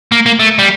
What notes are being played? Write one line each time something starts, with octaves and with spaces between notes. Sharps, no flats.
A#3
A#3
A3
G3